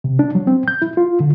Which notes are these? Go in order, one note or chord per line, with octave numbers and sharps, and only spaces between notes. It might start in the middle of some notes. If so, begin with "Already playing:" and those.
C3
D4
F#3
C4
G6
E4
F4
D3